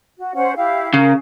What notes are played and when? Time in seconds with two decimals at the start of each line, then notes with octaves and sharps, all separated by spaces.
0.18 F#4
0.35 C#4 C5 F#5
0.56 E4 G4 F5
0.94 C#3 A#4